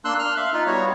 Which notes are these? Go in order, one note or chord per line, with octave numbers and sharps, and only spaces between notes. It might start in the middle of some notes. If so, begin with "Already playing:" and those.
A#3 D4 C6 E6 F#6
F6 F#6
E5 F5
D#4 F4
G3 B3 F#4 C#5